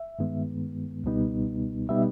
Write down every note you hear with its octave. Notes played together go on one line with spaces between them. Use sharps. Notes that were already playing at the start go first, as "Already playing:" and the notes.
Already playing: E5
G2 D#3 G#3 B3
C#2 B2 G3 B3 D#4
B2 G3 B3 D#4 E5